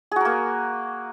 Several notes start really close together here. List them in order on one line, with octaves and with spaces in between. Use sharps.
G#4 F#4 A#4 A#3